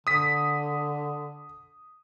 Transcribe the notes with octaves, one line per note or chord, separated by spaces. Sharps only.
D3 D#6 B6